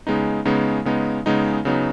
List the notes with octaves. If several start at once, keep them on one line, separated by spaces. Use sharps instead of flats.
C#3 G#3 B3 D#4
C#3 G#3 B3 D#4
C#3 G#3 B3 D#4
C#3 G#3 B3 D#4
C#3 F#3 B3 D#4